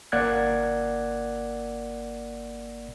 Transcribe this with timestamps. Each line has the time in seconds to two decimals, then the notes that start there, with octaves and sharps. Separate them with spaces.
0.12 G1 A#3 D5 F#5 F#6 G#6